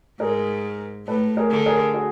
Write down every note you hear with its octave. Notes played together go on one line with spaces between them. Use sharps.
G#2 G#4 A#4
A2 A4 B4
G#4 A#4
D3
G#4 A#4
F#4 G#4